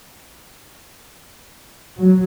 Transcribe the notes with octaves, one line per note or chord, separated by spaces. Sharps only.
F#3